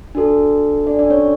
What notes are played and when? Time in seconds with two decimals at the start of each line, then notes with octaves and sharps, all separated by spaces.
0.15 D4 F#4 A4
0.87 D4 D5
0.99 D4 D5
1.10 C#4 C#5